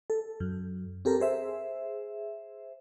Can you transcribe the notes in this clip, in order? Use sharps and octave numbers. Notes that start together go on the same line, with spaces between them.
A4
F#2
C4 G4 A4 A#4
G#4 C5 E5